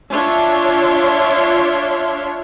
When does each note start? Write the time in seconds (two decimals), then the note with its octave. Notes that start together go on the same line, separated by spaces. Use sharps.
0.12 D4 F4 C#5 E5 C6